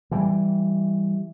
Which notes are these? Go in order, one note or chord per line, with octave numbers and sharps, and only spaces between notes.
E3 G3